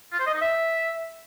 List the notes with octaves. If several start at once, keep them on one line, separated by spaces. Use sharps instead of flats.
F4
C5
D#5
D#4
E5